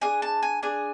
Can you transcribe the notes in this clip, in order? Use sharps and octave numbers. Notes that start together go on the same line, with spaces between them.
D4 G#4 G#5
A5
G#5
D4 G#4 G#5